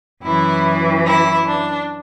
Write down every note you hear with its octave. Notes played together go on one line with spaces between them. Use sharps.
F#2 E3 E4
E4
D4